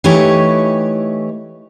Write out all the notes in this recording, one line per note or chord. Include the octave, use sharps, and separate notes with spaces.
E3 A3 D#4 G4 C#5